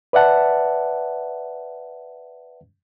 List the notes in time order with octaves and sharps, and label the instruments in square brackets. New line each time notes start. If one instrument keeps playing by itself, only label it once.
[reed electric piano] B4 D5 E5 F#5 A5